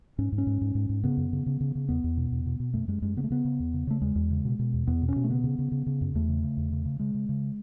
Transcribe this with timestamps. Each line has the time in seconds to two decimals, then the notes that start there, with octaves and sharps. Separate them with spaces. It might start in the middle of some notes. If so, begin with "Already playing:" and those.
0.18 G#2 C#4
0.32 G#2
0.38 C#4
0.47 G#2
0.61 G#2
0.75 G#2
0.89 G#2
1.04 C#3 B3
1.17 F#2
1.33 C#3
1.46 C#3
1.60 C#3
1.75 C#3
1.89 E2 B3
2.04 E2
2.17 B2
2.31 E2
2.46 B2
2.60 B2
2.74 F#2 A3
2.88 F#2 G#3
3.02 F#2 G#3
3.17 C#3 B3
3.24 A3
3.30 C#3 B3
3.45 C#3
3.60 E2
3.74 C#3
3.87 C#3 A3
4.01 E2 G#3
4.15 E2
4.31 C#3
4.45 B2
4.59 B2
4.73 E2
4.87 E2 B3
5.02 B2
5.09 C#4
5.16 B2
5.24 A3
5.30 C#3 B3
5.44 C#3
5.59 C#3
5.72 C#3
5.86 C#3
6.01 F#2
6.15 E2 A3
6.28 C#3
6.43 C#3
6.57 E2
6.72 C#3
6.85 C#3
6.99 C#3 G#3
7.14 C#3
7.29 C#3